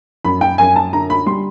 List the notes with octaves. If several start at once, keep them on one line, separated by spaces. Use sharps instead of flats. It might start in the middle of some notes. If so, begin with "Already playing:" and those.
F#2 B5
G5
F#2 G#5
A5
D3 A#5
B5
G3 C6